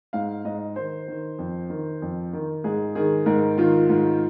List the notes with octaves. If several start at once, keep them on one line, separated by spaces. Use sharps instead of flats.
G#2 F5
G#2 D#5
D#3 C5
D#3
F2
D#3
F2
D#3
G#2 G#4
D#3 G#4
G#2 A#4
D#3 F4
G#2